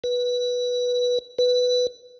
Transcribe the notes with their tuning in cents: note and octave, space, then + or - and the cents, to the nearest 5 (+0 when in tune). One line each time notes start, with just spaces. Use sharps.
B4 -10
B4 +5